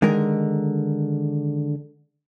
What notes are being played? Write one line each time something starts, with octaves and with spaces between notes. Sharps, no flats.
D3 D#3 G#3 A#4